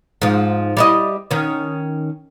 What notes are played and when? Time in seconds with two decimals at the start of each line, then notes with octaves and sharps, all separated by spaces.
0.22 G#2 F3
0.77 G3 E4 D#5
1.31 D#3 C#4